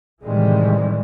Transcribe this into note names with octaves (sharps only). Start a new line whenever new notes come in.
A2 C3 D#3 E3 G3 G#3